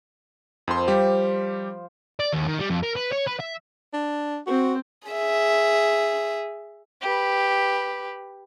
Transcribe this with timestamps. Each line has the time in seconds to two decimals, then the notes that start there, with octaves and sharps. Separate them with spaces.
0.68 F2 F3 F4 C5 C6
0.88 G3 G4
2.20 D5
2.33 D#2
2.47 D#3
2.59 G3
2.70 F2
2.83 A#4
2.96 B4
3.12 C#5
3.28 B4
3.40 E5
3.93 D4
4.47 C4 F#4 C5
5.08 G#4 E5
7.02 G4 B4